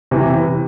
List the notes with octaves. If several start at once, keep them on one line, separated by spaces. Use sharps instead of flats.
C3 E3